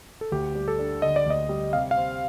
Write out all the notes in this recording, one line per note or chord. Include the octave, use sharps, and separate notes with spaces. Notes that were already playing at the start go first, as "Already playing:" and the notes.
A4
D2 G4
G3
A4
D4
D3 D#5
D5
D2 D#5
G3
C3 F5
F5
C4